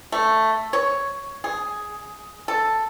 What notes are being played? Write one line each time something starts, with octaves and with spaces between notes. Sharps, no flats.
A3
C#5
G#4
A4